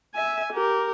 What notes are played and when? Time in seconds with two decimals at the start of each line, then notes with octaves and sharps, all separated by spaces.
0.15 E5 G#5
0.53 G4 A#4